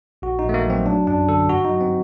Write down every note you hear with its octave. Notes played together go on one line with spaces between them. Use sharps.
A#1 F#4
D#4
A#1
A3
A#3
F#3
C4
F#3 D4
F#2 D4
D3 A4
G2 F#4
D#4
F#3
C4